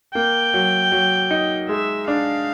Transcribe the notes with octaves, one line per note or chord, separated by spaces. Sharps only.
A#3 G5
F#3
F#3
D#4
G#3 E5
D4 F5